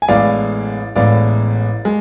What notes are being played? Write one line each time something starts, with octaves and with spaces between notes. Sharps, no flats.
G#5
A1 A2 G#3 B3 D5 F5
A1 A2 G#3 B3 D5 F5
G#3